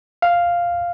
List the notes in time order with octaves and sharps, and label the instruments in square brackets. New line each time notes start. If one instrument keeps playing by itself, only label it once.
[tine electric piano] F5